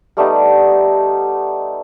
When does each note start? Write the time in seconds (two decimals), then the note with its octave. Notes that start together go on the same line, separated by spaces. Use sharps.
0.17 G3 A3 B3 D#4